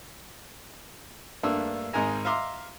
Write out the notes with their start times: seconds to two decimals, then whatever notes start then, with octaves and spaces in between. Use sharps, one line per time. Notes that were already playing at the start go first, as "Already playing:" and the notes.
1.43 G2 A3 A#3 D4 E6
1.93 G#1 G#2 D#4 A#4 G#5 A#5
2.25 E5 F5 A#5 C6 D6